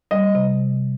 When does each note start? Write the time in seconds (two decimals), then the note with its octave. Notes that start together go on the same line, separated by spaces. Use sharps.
0.11 G3 D#5
0.35 C3